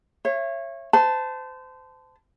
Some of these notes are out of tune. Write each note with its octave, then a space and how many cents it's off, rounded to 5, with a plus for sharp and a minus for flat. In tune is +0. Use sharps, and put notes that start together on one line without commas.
C#5 -25 E5 +35
C5 -30 A5 +0